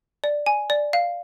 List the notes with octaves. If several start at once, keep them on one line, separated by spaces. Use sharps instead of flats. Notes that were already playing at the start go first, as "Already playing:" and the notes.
D5
G#5
D5
F5